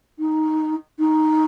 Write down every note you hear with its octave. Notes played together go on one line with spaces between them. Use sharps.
D#4
D#4